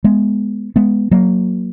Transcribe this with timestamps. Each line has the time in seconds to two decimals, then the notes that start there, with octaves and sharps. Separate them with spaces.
0.04 G#3 B3
0.76 G#3 B3
1.11 F#3 A#3